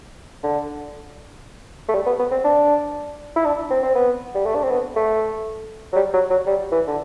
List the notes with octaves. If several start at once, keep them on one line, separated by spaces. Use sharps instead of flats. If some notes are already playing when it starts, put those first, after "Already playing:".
D3
A3
G3
B3
B3
C4
D4
E4
D4
C4
C4
B3
G3
A3
D4
C4
B3
A3
F#3
G3
F#3
F#3
G3
E3
D3